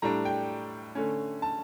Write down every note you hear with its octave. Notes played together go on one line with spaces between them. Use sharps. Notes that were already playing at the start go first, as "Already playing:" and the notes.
A2 G3 D4 A#5
G5
D3 A3 C#4
A5